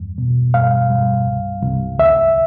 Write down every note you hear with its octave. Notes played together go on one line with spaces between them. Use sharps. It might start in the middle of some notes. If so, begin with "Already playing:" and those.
Already playing: E2 G2
B2
G2 F5
G2
C2
C2
D2 E5